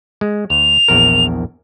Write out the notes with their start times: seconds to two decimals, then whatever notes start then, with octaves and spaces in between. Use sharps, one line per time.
0.21 G#3
0.50 D2 F7
0.88 A#1 E2 A#4